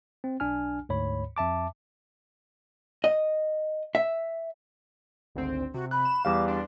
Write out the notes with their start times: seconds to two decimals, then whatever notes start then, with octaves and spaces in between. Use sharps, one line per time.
0.24 C4
0.40 B1 D4 G#5 F6
0.89 D2 G#2 C#5 B5
1.37 F2 E5 A5 D6
3.04 D#5
3.95 E5
5.35 G#1 D2 C4
5.74 C3 F#4
5.91 B5 F#6
6.05 E7
6.25 E2 G3 F5 D6
6.48 D4 C6